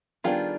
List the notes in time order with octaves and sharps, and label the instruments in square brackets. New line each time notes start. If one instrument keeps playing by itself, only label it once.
[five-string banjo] D#3 G3 B3 D4 F4 G#4